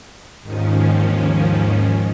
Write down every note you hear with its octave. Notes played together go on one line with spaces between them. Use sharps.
D#2 G#2 D#3 F3 C#4